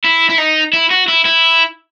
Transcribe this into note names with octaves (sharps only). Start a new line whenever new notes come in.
E4
E4
D#4
E4
F#4
E4
E4